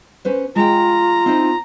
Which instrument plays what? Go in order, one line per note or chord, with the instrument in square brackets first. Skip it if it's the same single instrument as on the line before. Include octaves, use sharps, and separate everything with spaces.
[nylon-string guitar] C#4 B4 C5
[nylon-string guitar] G#3 G5 [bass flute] F4 [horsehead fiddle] A#5
[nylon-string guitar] C4 D#4 E4